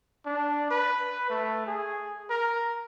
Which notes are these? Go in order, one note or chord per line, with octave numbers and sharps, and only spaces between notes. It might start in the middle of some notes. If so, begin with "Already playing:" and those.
D4
B4
A3
G#4
A#4